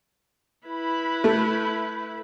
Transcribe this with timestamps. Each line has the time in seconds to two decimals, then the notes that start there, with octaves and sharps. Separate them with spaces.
0.67 E4 B4
1.24 A3